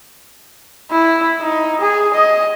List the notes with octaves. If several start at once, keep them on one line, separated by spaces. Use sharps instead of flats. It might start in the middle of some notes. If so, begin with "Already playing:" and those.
E4
D#4
G#4
D#5